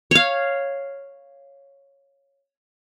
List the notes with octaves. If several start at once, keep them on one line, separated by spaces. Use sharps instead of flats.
C#5 F5